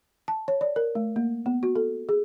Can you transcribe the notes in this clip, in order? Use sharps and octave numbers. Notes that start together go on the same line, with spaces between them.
A5
C#5
D5
A#4
A3
A#3
B3
F#4
A4
G#4